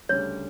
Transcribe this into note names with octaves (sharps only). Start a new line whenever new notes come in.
D2 C#3 G3 C#5